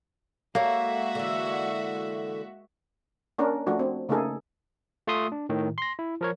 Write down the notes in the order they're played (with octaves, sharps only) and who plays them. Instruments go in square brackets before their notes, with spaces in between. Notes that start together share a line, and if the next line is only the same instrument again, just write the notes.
[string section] G#3 F#4 E5 [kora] A#3 [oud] A4 C#5
[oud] D3 E3
[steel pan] A#3 C#4 D4 A#4
F3 A3 D4 F#4
C4
C#3 A3 A#3 D#4 G#4 A4
[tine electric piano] A3 F4 E5 C6 D#6
D4
A2 D#3
C6 A#6
E4
F3 A#4 C#5